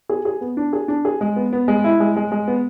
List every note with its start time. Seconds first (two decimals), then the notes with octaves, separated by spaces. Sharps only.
0.09 G#4
0.25 G#4
0.41 B3
0.57 D4
0.73 G#4
0.88 D4
1.05 G#4
1.21 G#3
1.36 B3
1.53 B3
1.68 G#3
1.84 E4
2.00 G#3
2.16 G#3
2.32 G#3
2.48 B3